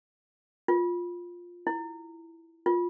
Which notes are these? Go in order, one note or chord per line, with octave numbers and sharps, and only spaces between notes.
F4
E4
F4